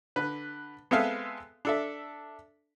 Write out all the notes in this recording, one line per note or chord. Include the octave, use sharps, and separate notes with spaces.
D3 B4
G#3 B3 C4 A4 E5 F5
D4 A4 E5